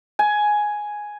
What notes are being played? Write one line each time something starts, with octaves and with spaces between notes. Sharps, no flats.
G#5